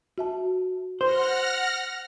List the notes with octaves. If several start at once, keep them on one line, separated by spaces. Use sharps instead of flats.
F#4 E5 A5
C5 F#5 F6 A#6